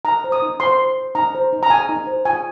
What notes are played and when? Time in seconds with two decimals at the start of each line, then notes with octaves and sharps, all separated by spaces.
0.05 D#4 A#5
0.24 C5
0.32 D#6
0.42 D#4
0.60 C5 C6
0.79 C5
0.98 C5
1.15 D#4 A#5
1.35 C5
1.53 D#4
1.63 A#5
1.70 D#4 G#5
1.89 D#4
2.07 C5
2.25 F4 G#5